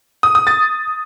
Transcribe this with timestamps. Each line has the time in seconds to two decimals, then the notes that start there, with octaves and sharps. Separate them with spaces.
0.23 D#6
0.35 D#6
0.47 A6